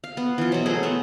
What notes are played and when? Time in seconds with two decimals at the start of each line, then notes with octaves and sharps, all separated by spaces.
0.04 F5
0.17 B3
0.38 E3 F4
0.52 B2 F#3
0.66 A3 C4 G#4
0.83 A3 B3